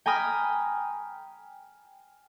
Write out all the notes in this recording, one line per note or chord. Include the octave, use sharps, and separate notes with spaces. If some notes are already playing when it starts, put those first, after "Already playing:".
G5 G#5 A#5 B5 D#6 F6